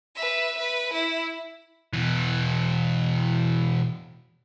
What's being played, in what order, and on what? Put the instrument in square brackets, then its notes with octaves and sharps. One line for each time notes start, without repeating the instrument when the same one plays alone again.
[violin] B4 E5
B4
E4
[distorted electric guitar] B2 E3